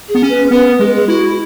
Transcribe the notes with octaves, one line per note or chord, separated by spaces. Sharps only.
G#4
B3
C#4
B4
B3 B4
G#3 G#4
B4
G#4
E4 F#4